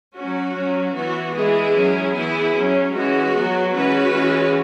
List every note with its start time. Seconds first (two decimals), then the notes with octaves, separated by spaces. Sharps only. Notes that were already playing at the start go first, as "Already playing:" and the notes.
0.16 F#3 C#4 F#4
0.56 F#3 C#4
0.95 E3 B3 F#4
1.34 E3 G#3 B3 E4 G#4
1.74 F#3 C#4
2.14 E3 B3 E4 G#4
2.54 F#3 C#4
2.93 E3 G#3 C#4 F#4
3.34 F#3 B3
3.73 E3 G#3 C#4 F#4 B4
4.12 E3 G#3 C#4